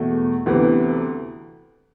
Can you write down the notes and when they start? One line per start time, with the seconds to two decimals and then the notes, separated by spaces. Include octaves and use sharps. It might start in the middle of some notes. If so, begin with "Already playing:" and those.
Already playing: E2 B2 A3
0.46 D2 C3 E3 B3